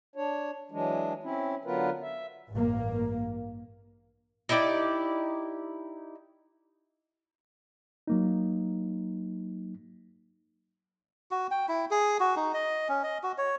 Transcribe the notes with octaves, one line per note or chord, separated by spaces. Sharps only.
D4 C#5
E3 F#3 G#3 D4
C4 C#4 E4
D3 F#3 B3 F4 A#4 B4
E5
A1 G2 A#3
D#4 E4 G4 D5
F#3 A#3 D#4
F#4
G5
E4
G#4
F#4
D#4
D#5
C#4
D#5
F#4
C#5